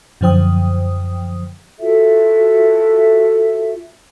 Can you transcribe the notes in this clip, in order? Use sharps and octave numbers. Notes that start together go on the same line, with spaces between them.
F#2 D3 F3 C5 G5 D#6
F4 F#4 A4 E5